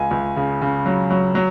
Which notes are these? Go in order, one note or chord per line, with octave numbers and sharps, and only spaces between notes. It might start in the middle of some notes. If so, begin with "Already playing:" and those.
Already playing: C#2 G#5
C#2
C#3
C#3
F#3
F#3
F#3